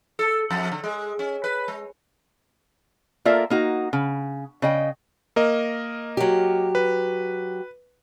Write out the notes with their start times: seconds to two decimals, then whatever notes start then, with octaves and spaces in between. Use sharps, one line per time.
0.19 A4
0.51 F2
0.72 D3
0.84 G#3
1.19 C#4
1.44 B4
1.68 G#3
3.25 A#3 F4 A4 A#4 D5 E5
3.50 A#3 D#4 F#4
3.93 C#3
4.62 C#3 D#5 G5
5.36 A#3 A#4 D#5
6.17 F#3 G4
6.75 B4